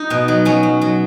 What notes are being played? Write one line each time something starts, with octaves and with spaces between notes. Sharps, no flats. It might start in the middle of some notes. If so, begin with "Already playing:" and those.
Already playing: D#4
B2
F#3
F#3 C#4
F#3
F#3